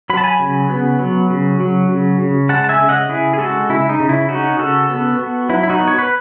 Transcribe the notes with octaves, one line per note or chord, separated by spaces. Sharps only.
F#3 B5
A5
G#5 B5
C#3
B3
F#3
C#3
F#3
C#3
C#3
G#3 F#5 A5
A5
E5 G#5
C#3
D#5 F#5
C#3 E4 G#4
G#4
G#3 F#4 A4
C#3 E4
D#4
C#3
E4
C#4 D#4 F#4
C#3 F#4 A4
B3
B3
F#3 E4
E4
D#4 F#4
B3
C#5
B4